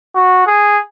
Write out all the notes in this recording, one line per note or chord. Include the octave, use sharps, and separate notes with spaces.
F#4
G#4